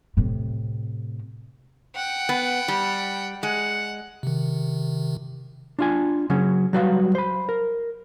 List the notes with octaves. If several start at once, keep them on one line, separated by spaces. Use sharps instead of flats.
A2 C3
F#5 G5
B3
G3
G#3 F#5
C3 D#3
D4 F4 G#5
C#3 F#3 C#4
F#3 G3 F#4 B4 D5 F5
C5 B5
A#4